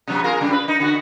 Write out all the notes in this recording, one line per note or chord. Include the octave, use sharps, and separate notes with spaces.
C3 F#3 B3
F4 G#4 A#4
C#3 G3 D4
B4
D#4
D3 F#4